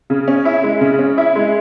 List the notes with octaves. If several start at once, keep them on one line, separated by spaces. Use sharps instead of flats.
C#3
C#4
E4
G#3
C#3
C#4
E4
G#3